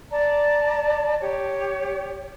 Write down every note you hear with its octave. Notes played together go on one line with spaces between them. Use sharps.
D5 A5 A#5
G4 C#5